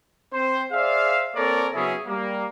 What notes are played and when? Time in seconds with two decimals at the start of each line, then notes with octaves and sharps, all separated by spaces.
0.33 C4 C5
0.72 G#4 C5 D5 E5 F5
1.35 A#3 C4 A4 A#4 C#5 D5
1.74 C#3 F#3 B3 C#4 E4 G#4
2.07 G3 A#3